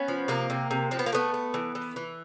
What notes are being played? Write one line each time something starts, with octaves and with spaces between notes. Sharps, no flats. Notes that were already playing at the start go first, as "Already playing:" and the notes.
Already playing: B3 C#4
F3
C3 A#3
C3
C3
F3 C4
B3
A#3
A3 B3
A3
E3
E3
E3